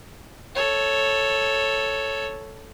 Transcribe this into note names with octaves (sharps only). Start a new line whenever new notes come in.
A4 C#5